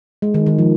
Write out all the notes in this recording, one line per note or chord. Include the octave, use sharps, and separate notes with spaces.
G#3
D#3
D#3
F3